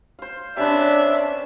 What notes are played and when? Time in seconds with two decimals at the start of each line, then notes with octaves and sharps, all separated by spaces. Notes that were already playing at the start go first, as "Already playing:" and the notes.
0.19 C5 F5
0.57 C3 C#4 D4 B4 D5 E5